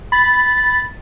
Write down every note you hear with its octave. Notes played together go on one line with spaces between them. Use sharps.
B5 A6